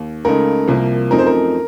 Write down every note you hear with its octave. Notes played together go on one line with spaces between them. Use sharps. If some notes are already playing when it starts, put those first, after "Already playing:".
Already playing: D#2
C#2 C#3 A3 D#4 A#4
C2 C3 F3 A#3
F#2 F3 A3 C4 D#4 A#4
C5
A#4